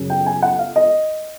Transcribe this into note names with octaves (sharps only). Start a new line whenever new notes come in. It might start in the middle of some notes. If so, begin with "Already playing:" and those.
Already playing: F#2 C#3
G5
G#5
F#5
F5
D#5